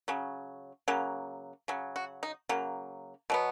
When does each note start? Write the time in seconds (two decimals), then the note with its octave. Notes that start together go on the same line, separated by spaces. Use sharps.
0.08 C#3 F#3
0.88 C#3 F#3 A#3
1.68 C#3 F#3
1.96 F#4
2.23 D#4
2.49 C#3 F#3 A#3
3.30 B2 F#3 B3